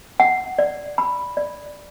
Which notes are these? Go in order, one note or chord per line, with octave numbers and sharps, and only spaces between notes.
F#5
D5
B5
D5